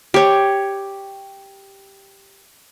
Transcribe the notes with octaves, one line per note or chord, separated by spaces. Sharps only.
G4 C#5